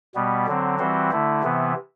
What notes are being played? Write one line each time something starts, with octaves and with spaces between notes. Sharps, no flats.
B2 G3 B3
D3 F#3 C4
E3 G3 C4 F#4 C5
D3 A3 E4
C3 E3 B3